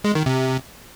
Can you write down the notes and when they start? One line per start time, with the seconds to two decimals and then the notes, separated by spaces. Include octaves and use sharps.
0.04 G#3
0.15 D#3
0.26 C3